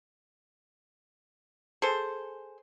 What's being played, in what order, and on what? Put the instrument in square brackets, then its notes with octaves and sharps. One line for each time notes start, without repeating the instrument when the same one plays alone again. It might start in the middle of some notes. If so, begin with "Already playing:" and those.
[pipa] G#4 A4 C5